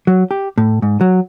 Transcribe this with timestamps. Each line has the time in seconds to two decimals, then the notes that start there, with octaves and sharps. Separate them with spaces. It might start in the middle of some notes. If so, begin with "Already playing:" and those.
0.07 F#3
0.31 G4
0.58 A2
0.82 G#2
1.01 F#3